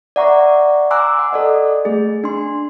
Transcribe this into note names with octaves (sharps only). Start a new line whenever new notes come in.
D5 E5 F#5 A#5 C#6
G#5 A#5 C6 D6 E6 F#6
F#5
A4 D5 D#5
A3 G#4
D4 C6